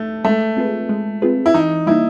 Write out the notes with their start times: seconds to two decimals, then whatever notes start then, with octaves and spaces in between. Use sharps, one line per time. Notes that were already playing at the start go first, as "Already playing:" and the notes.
Already playing: A3
0.24 G#3 A3
0.57 C4 F4 G#4 B4
0.89 G#3
1.22 C4 F4 G#4 B4
1.46 E4
1.54 E3 D#4
1.86 G3 A#3 D#4 E4